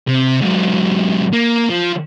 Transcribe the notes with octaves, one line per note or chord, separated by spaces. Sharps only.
C3
G#2 F#3
A#3
F3